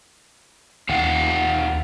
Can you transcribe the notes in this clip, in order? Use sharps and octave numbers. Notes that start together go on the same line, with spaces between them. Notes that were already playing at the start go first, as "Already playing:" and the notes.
D#2 D#4 F5 F#5